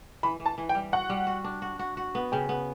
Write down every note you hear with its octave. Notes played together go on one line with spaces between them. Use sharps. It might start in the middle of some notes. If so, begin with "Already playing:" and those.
E3 B5
E3
A5
E3
G5
G3
F#4 F#5
G3
F#4
D4
F#4
F#4
F#4
B3
C#3 G5
B3